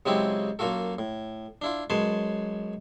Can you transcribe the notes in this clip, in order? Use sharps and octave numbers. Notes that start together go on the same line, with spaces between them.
C#3 F#3 G#3 C4 E4 G4
F#2 A#3 F4 F#4 A4
A2
D4 E4 F4
F#2 G#3 B4 C#5 A5 C6